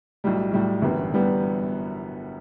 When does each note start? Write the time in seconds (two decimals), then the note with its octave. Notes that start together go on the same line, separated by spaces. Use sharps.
0.24 B1 A2 G3
0.52 B1 A2 G3
0.82 G1 F#2 E3 G3 B3
1.12 E3 G3 B3